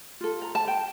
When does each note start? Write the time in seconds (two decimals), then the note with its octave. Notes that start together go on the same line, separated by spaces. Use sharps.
0.21 F4 A4
0.42 A#5
0.55 A5
0.68 G5